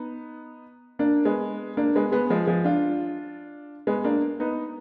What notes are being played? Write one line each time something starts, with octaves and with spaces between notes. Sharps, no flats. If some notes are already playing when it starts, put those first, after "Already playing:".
Already playing: B3 D#4
A#3 D4
G#3 B3
A#3 D4
G#3 B3
G#3 B3
F3 G#3
F3 G#3
D4 F4
G#3 B3
A#3 D4
B3 D#4